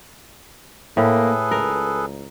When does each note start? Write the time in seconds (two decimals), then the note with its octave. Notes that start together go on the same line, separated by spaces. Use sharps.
0.97 A2 A#3 G#4 A4 B4
1.51 C#2 A#4